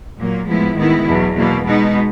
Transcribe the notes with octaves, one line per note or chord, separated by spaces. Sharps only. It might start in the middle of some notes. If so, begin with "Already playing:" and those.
A#2 F#3 A#3
A2 F3 G#3 B3 E4
D#3 G#3 B3 E4
E2 B2 F#3
B2 F#3 A#3
B2 G#3 B3 D#4